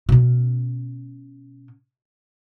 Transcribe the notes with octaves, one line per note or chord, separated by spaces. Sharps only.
B2 C#4